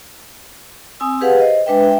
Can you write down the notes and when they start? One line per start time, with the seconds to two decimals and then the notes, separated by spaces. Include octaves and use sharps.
1.00 C4 G#5 D#6 E6
1.21 G4 G#4 B4 F5 F#5
1.40 C5 D#5
1.66 G#3 D4 B4 E5 G5
1.83 E5 G5